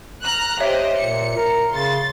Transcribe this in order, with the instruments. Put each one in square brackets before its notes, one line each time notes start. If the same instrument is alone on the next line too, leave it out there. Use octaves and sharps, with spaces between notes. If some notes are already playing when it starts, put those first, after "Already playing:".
[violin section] A#5 F6 F#6
[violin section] G4 C5 D#5 [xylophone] C#5 E5 F#6
[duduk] A#2 [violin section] C#7
[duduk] A#4
[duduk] C#3 [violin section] C6 A6